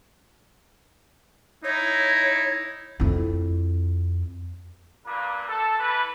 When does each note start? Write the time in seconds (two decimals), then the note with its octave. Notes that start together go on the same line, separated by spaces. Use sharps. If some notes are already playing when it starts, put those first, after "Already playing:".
1.64 D#4 E4 C#5
3.00 F2 E4
5.06 G2 A#2 A#3 B4
5.48 A4
5.78 E3 B4